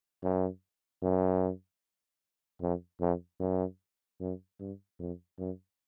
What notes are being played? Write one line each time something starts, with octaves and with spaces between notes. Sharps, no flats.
F#2
F#2
F2
F2
F#2
F#2
G2
F2
F#2